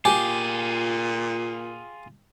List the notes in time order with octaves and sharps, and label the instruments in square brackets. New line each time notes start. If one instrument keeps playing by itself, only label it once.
[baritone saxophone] A#2 [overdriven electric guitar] F4 G#4 [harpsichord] G4 [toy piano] G#5